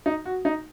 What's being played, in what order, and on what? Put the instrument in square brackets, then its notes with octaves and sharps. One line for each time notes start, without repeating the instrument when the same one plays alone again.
[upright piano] D#4
F#4
D#4